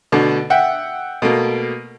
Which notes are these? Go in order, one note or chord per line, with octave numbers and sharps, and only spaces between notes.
B2 D3 A3
E5 F#5 G5
B2 A3 A#3